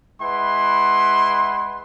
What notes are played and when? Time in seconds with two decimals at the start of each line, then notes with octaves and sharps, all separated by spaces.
0.21 G#3 E4 B4 F#5 C6